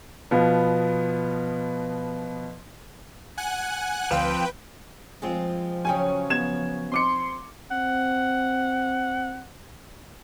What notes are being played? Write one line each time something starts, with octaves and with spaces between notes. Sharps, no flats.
B2 F3 B3
F#5 G#5 F#6
D2 F3 C4 B4 F5 G5
F3 G#3 C4 F4
C#3 F#3 C#4 G5 G#5
B3 G#6 E7
C4 C6 D6 C#7
C4 F#5